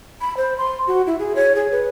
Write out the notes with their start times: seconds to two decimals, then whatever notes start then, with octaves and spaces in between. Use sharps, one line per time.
0.21 B5
0.37 C5
0.58 C6
0.87 F#4
1.07 E4
1.19 G#4
1.36 C#5
1.55 G#4
1.72 B4